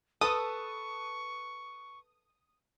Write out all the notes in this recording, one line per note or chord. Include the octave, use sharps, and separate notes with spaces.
A4 B4 A5 C#6 D#6